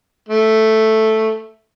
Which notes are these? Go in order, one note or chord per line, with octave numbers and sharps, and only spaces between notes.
A3